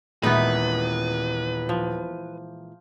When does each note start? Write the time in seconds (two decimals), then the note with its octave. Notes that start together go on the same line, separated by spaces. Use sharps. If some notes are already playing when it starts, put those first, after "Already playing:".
0.23 D#1 A#2 E3 G#3 B3 D#4 B4
1.69 F3